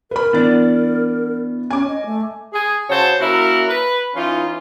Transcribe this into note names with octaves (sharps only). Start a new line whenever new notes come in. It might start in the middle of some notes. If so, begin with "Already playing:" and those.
A#4 B4 B5
E3 B3 D4 D5 A6
C#4 G#5 D6
D#5
A3
G#4
C#3 F#4 C5 C#5 A5
A#3 C#4 E4 F#4 A#4
B4
E3 C#4 D#4 F4